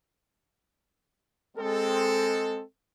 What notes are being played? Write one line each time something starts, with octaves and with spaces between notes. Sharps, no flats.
G#3 C4 A4